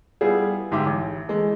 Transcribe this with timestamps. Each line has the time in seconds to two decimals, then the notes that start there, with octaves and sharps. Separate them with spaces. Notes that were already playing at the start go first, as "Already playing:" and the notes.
0.21 G3 B3 E4 F4 G#4
0.71 G1 G#2 G4 E5 D6
0.86 A1
1.29 E3 G#3 A3 E4